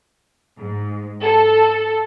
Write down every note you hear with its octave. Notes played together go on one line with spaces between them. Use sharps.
G#2
A4